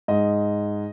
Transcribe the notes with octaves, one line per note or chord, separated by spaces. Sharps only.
G#2 D#5